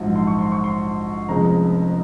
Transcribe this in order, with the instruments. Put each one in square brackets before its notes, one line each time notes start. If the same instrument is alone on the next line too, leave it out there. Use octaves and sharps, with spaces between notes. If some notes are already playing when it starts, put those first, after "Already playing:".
Already playing: [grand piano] A#1 G#2 F#3
C6
C#6
C6
C#6
C6
F1 F2 C#3 G#3 A#5